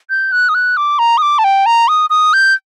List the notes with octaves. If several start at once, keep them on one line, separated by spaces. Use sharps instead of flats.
G6
F#6
D#6
F#6
D6
A#5
D#6
D6
A5
G5
A#5
D#6
D#6
G6